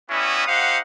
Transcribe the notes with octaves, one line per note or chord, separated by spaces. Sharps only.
G3 B3 C#4 E4 F#4 D#6
D#4 G4 C5 F5 F#5